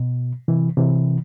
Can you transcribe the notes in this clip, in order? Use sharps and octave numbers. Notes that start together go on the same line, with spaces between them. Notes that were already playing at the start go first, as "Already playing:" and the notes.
Already playing: B2
C3 E3
C3 E3